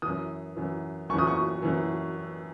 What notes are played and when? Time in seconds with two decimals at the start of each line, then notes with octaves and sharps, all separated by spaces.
0.02 F#2 E3 D#6
0.56 F#2 E3
1.09 F#2 C#6
1.14 E3 D#6
1.27 C#6
1.62 F#2 E3